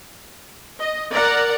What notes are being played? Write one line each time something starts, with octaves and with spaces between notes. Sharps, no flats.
D#5
A#4 D5 F#5 A#5